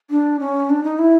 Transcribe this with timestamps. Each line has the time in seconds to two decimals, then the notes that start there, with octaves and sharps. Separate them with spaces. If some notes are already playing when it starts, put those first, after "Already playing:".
0.10 D4
0.40 C#4
0.70 D4
0.84 D#4
0.99 E4